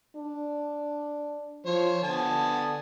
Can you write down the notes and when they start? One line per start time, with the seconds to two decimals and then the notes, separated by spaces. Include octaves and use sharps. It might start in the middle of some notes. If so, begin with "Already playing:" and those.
0.16 D4
1.66 F3 C5 C#5
2.03 D3 B3 G#5 A5